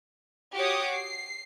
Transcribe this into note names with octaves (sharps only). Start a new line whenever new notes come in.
F#4 G4 C#5 D6 D#6
C7